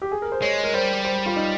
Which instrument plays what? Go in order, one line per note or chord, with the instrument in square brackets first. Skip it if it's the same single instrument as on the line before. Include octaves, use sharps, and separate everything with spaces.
[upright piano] G4
G#4
A#4
C5
[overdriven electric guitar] G#3 [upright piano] C#5
[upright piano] A#4
[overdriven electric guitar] G3 [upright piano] C5
[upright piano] C5
F4
D#4